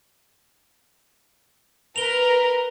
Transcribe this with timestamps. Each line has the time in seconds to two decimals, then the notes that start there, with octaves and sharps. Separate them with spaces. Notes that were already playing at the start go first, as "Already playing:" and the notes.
1.96 A#4 B4 F7 G7